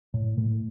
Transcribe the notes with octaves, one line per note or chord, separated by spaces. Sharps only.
A2
A2